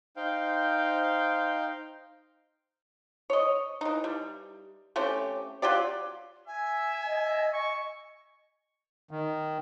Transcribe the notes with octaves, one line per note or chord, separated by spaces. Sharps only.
D#4 C5 F5 G5
C#5 D#5
E3 D#4
G3
A3 C4 C#4 G4
F#3 F4 G4 D5
E5 G#5
D#5
C#6
D#3